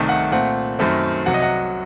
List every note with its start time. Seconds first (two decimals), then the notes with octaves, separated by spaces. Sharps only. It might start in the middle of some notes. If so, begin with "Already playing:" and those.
Already playing: C2 C3 D#3 A3 A5
0.09 F#5
0.31 A#2 A3 C4 F#5
0.79 F#2 D#3 A3 C4
1.26 C2 C3 F#3 F#5
1.34 D#5
1.42 F#5